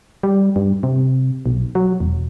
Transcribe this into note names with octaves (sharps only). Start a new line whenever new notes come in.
G3
G2
C3
B1
F#3
E1